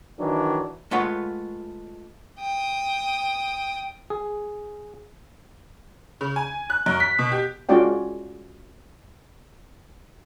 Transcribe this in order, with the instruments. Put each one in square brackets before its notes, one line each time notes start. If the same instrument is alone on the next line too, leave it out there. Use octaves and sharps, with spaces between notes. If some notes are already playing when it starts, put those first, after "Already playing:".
[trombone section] D#3 E3 F#3 D4
[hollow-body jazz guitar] G#3 A3 F4 B4 C#5 F#5
[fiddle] G5 D#6
[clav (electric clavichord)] G#4
[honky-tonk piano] C#3
G#5
F#6
F#2
B6
B2
G4
[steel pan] G#3 C#4 F4 F#4 D5 G5